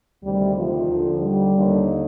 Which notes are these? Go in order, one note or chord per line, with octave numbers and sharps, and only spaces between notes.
D2 C3 D#3 G3
F3
D#2
D3
G3
D#2 D3